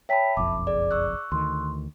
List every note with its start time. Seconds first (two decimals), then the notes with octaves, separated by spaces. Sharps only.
0.09 C#5 E5 G5 A5 B5 B6
0.37 F#1 B1 F2 D6
0.67 G#4 D5
0.91 C#6 E6 F#6
1.32 D2 D#3 C6